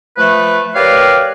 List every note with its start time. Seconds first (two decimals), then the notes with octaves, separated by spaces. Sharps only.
0.18 F3 A3 B4
0.75 G4 A#4 B4 C#5 D5 F5